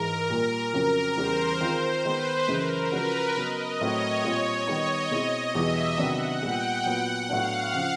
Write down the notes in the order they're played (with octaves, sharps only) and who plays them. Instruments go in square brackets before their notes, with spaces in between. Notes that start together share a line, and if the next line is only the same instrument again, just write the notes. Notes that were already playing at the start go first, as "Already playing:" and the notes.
Already playing: [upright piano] G#2 E3 G#3 [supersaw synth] A#4
[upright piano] A#2 G3 A#3
[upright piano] F2 C#3 F#3 [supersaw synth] A#4
[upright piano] E2 C#3 E3 G3 [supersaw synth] C5
[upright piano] D#3 G#3 C4 F4 [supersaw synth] C5
[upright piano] D#3 G#3 B3 [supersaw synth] B4
[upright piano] F#2 C#3 E3 G#3 [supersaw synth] A#4
[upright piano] C#3 F3 G#3 C#4 F#4 [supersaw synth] B4
[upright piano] C#3 F#3 B3 [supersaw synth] D#5
[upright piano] A2 F#3 A3 C4 [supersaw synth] C#5
[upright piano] A#2 G3 C4 F4
[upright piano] D#3 G3 B3 D#4 [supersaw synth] D#5
[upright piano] B2 G#3 C4 E4
[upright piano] E2 B2 G3 B3 E4 [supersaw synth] E5
[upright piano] C3 D#3 F#3 B3 D4 [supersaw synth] F#5
[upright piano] A#2 G3 B3 [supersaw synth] G5
[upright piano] A#2 F#3 B3 [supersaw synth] F#5
[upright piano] A2 F#3 B3 D4 [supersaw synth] F5
[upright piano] C#3 F3